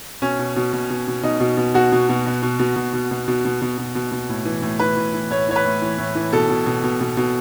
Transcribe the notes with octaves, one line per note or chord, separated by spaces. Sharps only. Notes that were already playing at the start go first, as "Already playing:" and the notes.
B2 C#4
B2
B2
B2
B2
B2
B2 D#4
B2
B2
B2 F#4
B2
B2
B2
B2
B2
B2
B2
B2
B2
B2
B2
B2
B2
B2
A2
E3
A2
E3 B4
A2
E3
A2 C#5
E3 C#5
B4
A2
E3
A2
E3
B2 A4
B2
B2
B2
B2
B2